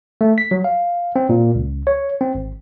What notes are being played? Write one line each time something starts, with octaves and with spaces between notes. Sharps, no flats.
A3
B6
F#3
F5
C4
A#2
C#2
C#5
C4
G#1